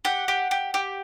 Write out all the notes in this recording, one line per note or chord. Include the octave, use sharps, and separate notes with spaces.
G4 F#5
G4
G4
G4